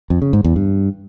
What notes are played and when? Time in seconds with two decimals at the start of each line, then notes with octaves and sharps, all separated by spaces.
0.10 F2
0.22 C#3
0.33 G#2
0.44 E2
0.56 G2